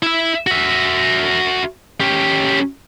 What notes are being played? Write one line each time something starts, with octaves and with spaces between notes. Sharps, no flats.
E4 E5
F#4 E5
C#4 G4